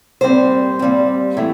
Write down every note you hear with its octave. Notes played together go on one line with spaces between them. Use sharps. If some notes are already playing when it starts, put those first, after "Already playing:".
A#2 G3 C4 C5
A#2 G3 C4
A2 E3 A3